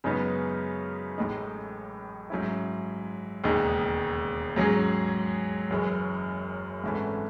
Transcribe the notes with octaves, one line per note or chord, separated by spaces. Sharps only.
F#2 C#3 G#3 B3 D#4
A1 A2 G#3 D#4
G#2 F#3 C#4 E4
E1 D#2 C#3 G#3 D#4
G#2 F#3 C#4 G#4
F#1 F#2 E3 G#3
G#1 G#2 E3 A3 C#4